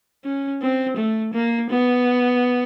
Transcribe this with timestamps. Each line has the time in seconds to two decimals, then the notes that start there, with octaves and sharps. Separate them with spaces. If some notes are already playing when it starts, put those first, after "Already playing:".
0.24 C#4
0.62 C4
0.97 A3
1.33 A#3
1.70 B3